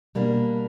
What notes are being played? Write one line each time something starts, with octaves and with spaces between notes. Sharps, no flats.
B2 G3 A#3 D4